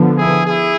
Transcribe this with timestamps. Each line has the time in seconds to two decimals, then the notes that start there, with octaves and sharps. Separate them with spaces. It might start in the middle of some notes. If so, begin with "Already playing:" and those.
Already playing: D3 F3 B3
0.17 E4 G#4
0.45 E4 G#4